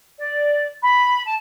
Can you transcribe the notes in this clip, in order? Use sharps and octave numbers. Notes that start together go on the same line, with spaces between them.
D5
B5
A5